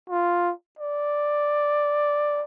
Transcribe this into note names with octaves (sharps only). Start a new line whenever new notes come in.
F4
D5